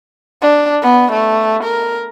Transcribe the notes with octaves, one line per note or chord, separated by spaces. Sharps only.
D4
B3
A3
A#4